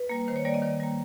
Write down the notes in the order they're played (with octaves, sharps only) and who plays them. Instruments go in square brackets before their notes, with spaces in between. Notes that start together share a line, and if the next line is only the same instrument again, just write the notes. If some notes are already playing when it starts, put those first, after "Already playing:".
Already playing: [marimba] B4
G3 A#3
D#3 C5
C#5
G3 A#3 D5
D#5
D#3 D5
G3 A#3